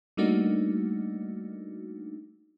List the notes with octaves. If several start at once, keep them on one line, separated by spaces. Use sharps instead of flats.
G3 A3 A#3 D4 D#4 F#4